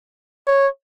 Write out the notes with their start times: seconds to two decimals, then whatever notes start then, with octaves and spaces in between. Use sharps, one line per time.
0.47 C#5